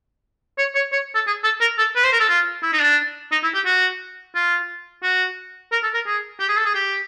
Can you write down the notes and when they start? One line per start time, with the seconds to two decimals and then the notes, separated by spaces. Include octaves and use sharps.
0.58 C#5
0.75 C#5
0.92 C#5
1.15 A4
1.27 G#4
1.44 A4
1.61 A#4
1.78 A4
1.96 B4
2.04 C5
2.13 A#4
2.20 A4
2.29 F4
2.63 E4
2.73 D#4
2.81 D4
3.32 D#4
3.43 E4
3.54 G4
3.66 F#4
4.35 F4
5.03 F#4
5.72 A#4
5.83 A4
5.94 A#4
6.06 G#4
6.40 G4
6.49 G#4
6.57 A4
6.65 G#4
6.75 G4